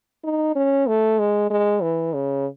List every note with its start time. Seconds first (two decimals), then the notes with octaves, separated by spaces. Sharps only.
0.24 D#4
0.55 C#4
0.88 A3
1.19 G#3
1.50 G#3
1.82 E3
2.14 C#3